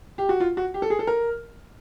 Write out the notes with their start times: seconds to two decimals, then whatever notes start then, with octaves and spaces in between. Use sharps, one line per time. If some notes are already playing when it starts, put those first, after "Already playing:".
0.18 G4
0.29 F#4
0.40 F4
0.57 F#4
0.74 G4
0.82 A4
0.90 G#4
0.99 A4
1.07 A#4